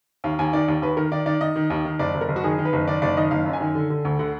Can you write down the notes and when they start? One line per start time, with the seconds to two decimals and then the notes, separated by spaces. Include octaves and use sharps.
0.24 D#2 F5
0.39 D#2 G#5
0.53 D#3 D5
0.68 D#2
0.82 D#2 B4
0.97 D#3 A#4
1.12 D#3 D5
1.26 D#3 D5
1.41 D#3 D#5
1.56 D#3
1.70 D#2
1.85 D#3
1.99 F#1 D5
2.14 F#1
2.21 A#4
2.29 F#1
2.36 F#4
2.44 D#3 G#4
2.59 D#3
2.65 B4
2.73 F#1
2.88 D#3 D5
3.02 F#1 D5
3.17 D#3 D#5
3.31 F#1 F5
3.46 F#2
3.53 G#5
3.60 D#3
3.75 D3
3.90 D3
4.05 D2
4.19 D3 F#5